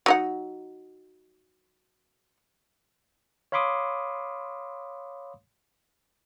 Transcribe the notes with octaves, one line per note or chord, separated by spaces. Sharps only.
F#3 D#4 F#5
C#5 F5 B5 C6 D6 D#6